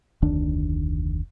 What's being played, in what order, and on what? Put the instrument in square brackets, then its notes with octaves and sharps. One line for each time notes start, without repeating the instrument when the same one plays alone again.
[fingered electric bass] F1 D2 D#3 D4